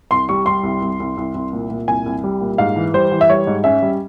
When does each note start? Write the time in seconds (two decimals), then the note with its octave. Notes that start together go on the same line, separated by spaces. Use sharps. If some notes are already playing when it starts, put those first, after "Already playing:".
0.11 C2 C6
0.29 G3 C#6
0.46 G3 C6
0.63 C2
0.82 C2
1.00 C2
1.17 C2
1.35 C2
1.53 A#2
1.70 A#2
1.88 C2 G#5
2.06 C2
2.24 G3
2.41 A#2
2.58 G#2 F5
2.76 E3
2.94 G3 C5
3.12 E3
3.21 E5
3.30 G3 C#5
3.47 G#2
3.64 C#4 E5
3.82 G3